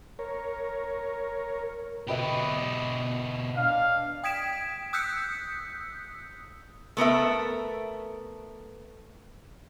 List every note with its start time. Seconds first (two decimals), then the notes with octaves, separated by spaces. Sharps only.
0.19 A#4 C#5
2.08 B2 G4 B4 D#5 E5
3.57 D4 F5
4.23 G5 D#6 G#6 B6 D7 E7
4.93 D#6 E6 F#6 G6 B6 C#7
6.97 A3 B3 A#4 E5